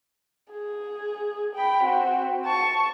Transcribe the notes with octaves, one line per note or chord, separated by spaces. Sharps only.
G#4
G5 B5
C4 F#4
A5 C#6